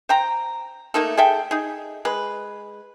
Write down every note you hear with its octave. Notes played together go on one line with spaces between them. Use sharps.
C5 G5 A#5
A3 A#3 D#4 A4
G#4 A4 E5 G5
D#4 G#4
G#3 B4